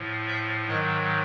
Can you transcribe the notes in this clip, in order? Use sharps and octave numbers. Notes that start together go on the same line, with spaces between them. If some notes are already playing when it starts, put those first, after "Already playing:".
Already playing: A2 F3
E5
G#2 D#3 F#3 D#5